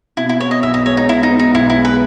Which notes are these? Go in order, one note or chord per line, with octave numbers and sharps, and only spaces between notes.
B2 E4
E4
B3 C#5
D#5
B1 E5
D#5
G#3 C#5
D#4
B2 E4
D#4
B3
D#4
B1 E4
E4
G#3
B4